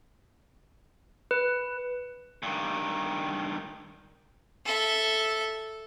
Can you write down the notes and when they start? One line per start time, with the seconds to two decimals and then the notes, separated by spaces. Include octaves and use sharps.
1.31 B4
2.43 G2 D#3
4.65 A4 E5